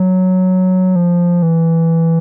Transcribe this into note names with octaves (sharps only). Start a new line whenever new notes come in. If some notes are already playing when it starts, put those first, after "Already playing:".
Already playing: F#3
F3
E3